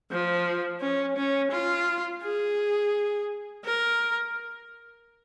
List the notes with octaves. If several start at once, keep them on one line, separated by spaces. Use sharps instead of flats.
F3
C#4
C#4
F4
G#4
A#4